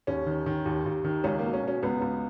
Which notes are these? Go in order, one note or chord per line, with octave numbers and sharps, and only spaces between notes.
D#2 C#4
D#3
D#3
D#2
D#2
D#3
C#2 C#4
B2 A#3
C#4
B2 C#4
C#2 B3
C#2